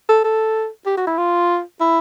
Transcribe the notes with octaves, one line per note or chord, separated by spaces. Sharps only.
A4
A4
G4
F#4
E4
F4
E4